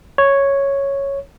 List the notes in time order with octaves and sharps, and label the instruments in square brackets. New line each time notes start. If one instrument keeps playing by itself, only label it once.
[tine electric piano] C#5